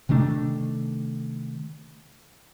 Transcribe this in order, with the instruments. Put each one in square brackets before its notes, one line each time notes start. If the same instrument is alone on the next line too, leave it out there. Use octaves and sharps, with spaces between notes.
[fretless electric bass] C3 D#3 A3 D4